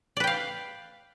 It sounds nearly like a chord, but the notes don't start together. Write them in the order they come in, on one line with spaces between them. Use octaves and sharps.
D5 B4 G5 F5